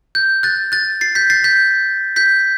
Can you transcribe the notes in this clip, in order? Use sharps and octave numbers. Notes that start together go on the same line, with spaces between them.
G6
F#6 A6
F#6 A6
A6 C7
G6 B6
A6 C7
G6 B6
G6 B6